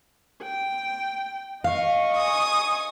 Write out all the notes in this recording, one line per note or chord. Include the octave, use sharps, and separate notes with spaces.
G5
D#5 F5 C#6
G#5 D#6